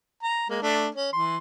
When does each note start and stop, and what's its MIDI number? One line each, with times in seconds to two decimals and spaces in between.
0.23 0.48 82
0.50 0.62 56
0.50 0.62 58
0.62 0.88 57
0.62 0.88 62
0.95 1.12 61
1.13 1.38 52
1.13 1.38 84